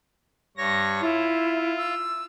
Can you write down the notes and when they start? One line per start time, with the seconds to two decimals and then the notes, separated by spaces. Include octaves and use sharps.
0.57 G2 C#5 A#6
1.01 E4 F4
1.77 E6